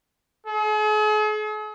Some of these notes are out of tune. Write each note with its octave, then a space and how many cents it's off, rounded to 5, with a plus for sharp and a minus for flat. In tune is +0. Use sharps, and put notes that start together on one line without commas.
G#4 +45